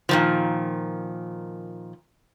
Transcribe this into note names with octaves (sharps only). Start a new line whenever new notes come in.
A#2 D#3 F3